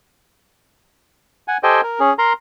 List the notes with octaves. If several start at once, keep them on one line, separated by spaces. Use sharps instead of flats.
F#5 G#5
G4 A4 C5 D#5 G5 G#5
A#4
C#4 G#4
A#4 A#5 C6